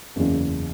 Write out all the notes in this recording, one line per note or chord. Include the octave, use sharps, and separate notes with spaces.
F#1 E2 C#3